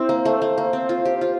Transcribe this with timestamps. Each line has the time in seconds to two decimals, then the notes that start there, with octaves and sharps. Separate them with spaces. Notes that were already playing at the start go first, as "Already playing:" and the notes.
Already playing: C4 E4 C5
0.09 A#3
0.25 A3
0.42 A3
0.58 A#3
0.73 C4
0.89 F4
1.05 G4
1.21 F4